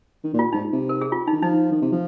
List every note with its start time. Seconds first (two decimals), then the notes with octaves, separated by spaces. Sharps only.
0.24 D#3
0.33 A#2
0.39 F4
0.53 G#2 D#4
0.73 C3
0.89 A#4
1.01 G#4
1.12 F4
1.27 D#3 D#4
1.42 F3 D#4
1.71 D#3
1.82 C3
1.92 F3